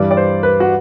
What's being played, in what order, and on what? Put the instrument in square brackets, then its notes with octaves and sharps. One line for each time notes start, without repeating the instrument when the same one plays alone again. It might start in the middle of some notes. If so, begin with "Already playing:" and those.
Already playing: [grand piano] G2 E3 G3 D5
D5
C5
B4
F#4